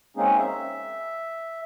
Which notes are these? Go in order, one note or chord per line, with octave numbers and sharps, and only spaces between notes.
G#3 A#3 C4 C#4 D#4 G#4
E5